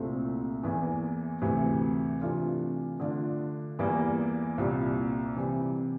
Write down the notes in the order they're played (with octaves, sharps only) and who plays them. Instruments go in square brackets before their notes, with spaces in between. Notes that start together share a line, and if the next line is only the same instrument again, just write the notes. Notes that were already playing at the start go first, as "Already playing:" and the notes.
Already playing: [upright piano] C2 A#2 A3 C4 E4
E2 E3 A#3
D2 C3 E3
C3 E3 A3 D4 F4
D3 A3 D4 F4
E2 E3 G3 A#3
C2 A#2 G3
C3 E3 G3